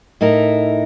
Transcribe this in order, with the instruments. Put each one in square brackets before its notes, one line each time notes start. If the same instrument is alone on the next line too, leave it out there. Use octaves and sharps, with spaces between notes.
[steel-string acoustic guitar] A2 D#4 E4 A#4